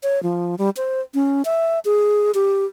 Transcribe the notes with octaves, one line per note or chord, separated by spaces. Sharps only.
C#5
F3
G3
C5
C#4
E5
G#4
G4